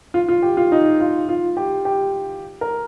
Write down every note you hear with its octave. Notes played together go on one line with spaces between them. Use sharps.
F4
F4
G4
F4
D#4
F4
F4
G4
G4
A#4